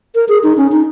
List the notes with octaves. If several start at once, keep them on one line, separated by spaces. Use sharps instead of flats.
A#4
G#4
D#4
C#4
D#4